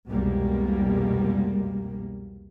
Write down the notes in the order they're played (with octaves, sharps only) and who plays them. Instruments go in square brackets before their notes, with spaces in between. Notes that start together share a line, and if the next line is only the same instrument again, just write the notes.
[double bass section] C2 F2 B2 G3 G#3 A#3